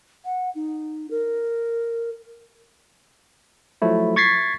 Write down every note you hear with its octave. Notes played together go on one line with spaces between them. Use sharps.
F#5
D#4
A#4
F3 F#3 A3 E4
C#6 G#6 A6 B6 C7